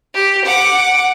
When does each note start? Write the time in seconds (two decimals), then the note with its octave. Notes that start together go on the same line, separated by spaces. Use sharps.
0.15 G4
0.45 F#5 D6